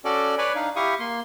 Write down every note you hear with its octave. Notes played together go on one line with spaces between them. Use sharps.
C#4 F#4 A4 D5
B4 C#5 D5 G#5 B5
D4 D#4 F5
E4 G4 F5 C#6 D#6
A#3 C6